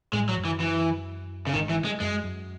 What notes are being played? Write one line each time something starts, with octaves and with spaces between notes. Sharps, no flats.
A1 A2 G#3
F#3
F#2
E3
E3
C#3
G#1 G#2 D#3
E3
G#3
F#2 G#3
F#2